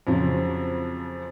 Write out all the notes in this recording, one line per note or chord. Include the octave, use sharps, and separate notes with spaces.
F2 C#3 F3 F#3